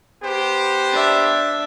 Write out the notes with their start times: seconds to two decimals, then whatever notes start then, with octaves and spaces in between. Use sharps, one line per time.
0.23 B3 G4 C5
0.92 D4 E5